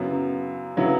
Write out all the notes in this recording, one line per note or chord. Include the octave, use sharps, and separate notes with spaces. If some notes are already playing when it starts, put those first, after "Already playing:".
Already playing: F#2 C#3 F#3 B3 E4
C#3 F#3 B3 E4